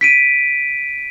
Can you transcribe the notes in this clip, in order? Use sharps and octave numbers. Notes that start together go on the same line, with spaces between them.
B6 D7 D#7